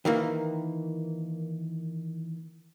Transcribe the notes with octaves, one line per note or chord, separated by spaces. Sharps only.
D#3 E3 A#3